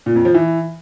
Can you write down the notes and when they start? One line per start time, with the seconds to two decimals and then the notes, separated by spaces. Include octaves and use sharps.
0.06 A#2
0.16 F2
0.25 F3
0.34 E3